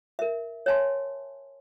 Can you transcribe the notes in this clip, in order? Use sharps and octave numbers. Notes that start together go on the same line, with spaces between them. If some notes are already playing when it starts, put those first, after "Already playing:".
A#4 E5
C#5 E5 G#5 A5 C6